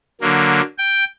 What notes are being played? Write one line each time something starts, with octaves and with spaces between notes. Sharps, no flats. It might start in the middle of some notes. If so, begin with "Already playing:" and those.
D3 F#3 A#3
G5